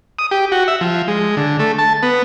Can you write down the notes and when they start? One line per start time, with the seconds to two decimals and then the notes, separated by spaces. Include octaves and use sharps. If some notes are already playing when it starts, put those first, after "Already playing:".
0.19 D#6
0.31 G4
0.52 F#4
0.68 E5
0.81 F3
1.08 G#3
1.37 D3
1.59 A3
1.79 A5
2.03 B3